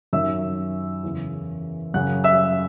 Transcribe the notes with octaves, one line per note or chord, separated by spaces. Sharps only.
F#2 D#3 F#3 E5 E6
E2 C#3 E3
F#2 C#3 F#3 F#5 F#6
E5 E6